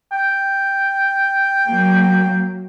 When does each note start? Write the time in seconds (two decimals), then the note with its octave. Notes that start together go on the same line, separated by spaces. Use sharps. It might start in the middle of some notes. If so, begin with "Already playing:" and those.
0.12 G5
1.66 F#3 A#3